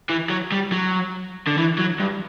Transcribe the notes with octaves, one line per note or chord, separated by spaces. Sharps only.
E3
F#3
G3
F#3
D3
E3
F#3
G2